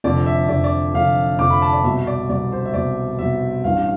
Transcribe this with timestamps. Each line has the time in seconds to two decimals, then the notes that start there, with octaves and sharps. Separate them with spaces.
0.04 F1 F2 D3 D5
0.26 E5
0.49 F1 F2 D3 D5
0.64 D5
0.94 F1 F2 D3 F5
1.39 F1 F2 D3 D6
1.50 B5
1.62 A5
1.73 D5
1.84 C2 B2 E5
2.07 D5
2.29 C2 B2 D5
2.52 C5
2.65 E5
2.74 C2 B2 D5
3.19 C2 B2 E5
3.64 A1 G2 E3 F5